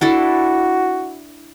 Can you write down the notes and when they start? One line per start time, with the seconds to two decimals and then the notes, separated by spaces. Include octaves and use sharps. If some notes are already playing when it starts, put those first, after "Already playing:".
0.01 D4 E4 F#4 A4